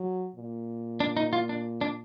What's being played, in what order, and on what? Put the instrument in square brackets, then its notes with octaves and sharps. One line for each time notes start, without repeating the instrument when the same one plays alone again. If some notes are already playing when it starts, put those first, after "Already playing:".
Already playing: [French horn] F#3
A#2
[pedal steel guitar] D4
D#4
F4
D4
D4